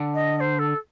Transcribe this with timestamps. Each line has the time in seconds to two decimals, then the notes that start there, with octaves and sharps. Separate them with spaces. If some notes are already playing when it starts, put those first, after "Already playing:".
Already playing: D3
0.14 D#5
0.37 D#5
0.40 C5
0.59 A4